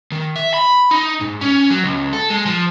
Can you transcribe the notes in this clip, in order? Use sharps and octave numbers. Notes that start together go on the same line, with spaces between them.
D#3
E5
B5
D#4
G#2
C#4
F#3
C#2
A4
G#3
F3